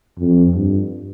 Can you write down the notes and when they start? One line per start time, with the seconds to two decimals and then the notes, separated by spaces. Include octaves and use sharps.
0.18 F2
0.53 G2